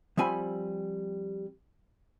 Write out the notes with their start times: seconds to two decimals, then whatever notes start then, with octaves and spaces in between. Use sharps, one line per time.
0.17 F3 G3 C4 G#5 B5